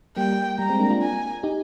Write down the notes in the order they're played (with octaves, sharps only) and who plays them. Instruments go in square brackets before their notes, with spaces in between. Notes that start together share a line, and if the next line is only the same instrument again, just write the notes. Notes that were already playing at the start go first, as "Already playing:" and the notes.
[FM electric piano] G3 A#3 [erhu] G5
[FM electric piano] G3 [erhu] A#5
[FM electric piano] G#3 C4
A#3 D4
D4 F4
[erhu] G#5
[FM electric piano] D#4 G4